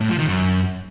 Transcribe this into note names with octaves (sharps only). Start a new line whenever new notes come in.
A2
F3
D#3
F#2